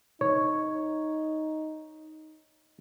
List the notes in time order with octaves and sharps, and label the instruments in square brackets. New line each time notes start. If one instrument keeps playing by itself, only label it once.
[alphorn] D#4 [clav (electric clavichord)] C#5